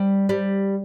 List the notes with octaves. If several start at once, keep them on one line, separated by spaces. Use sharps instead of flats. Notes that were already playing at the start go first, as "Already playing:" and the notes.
Already playing: G3
G3